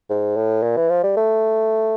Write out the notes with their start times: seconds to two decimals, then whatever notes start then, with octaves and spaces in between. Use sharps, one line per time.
0.10 G#2
0.37 A2
0.63 A#2
0.77 E3
0.89 F3
1.03 G3
1.17 A3